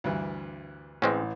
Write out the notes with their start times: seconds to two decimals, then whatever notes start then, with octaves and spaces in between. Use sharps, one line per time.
0.04 D2 G2 E3
1.02 A1 E3 G#3 C4 C#4